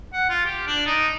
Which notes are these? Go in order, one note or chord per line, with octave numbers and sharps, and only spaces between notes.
F#5
F4
G4
D4
D#4